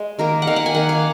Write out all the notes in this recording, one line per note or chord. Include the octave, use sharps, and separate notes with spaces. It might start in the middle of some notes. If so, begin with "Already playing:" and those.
Already playing: G#3
D#3 A#3 A#4
F#5
D#3 A#3 F5
F#5
G#5
D#3 A#3 F#5
F5